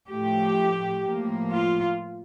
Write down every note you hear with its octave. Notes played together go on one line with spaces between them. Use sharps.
A2 F3 A3 G4
A2 F3 A#3
F4